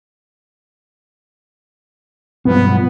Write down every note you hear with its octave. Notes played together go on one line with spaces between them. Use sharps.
B1 G2 F3 B3